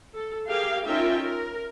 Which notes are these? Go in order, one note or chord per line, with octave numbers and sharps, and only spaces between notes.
A4
G4 G#4 A#4 F5 G5
C#4 D#4 F4 A#4 E5 G5
A#4